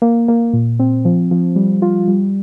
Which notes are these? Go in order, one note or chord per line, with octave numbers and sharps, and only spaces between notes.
A#3
A#3
A#2
C4
F3
F3
G3
F4
G3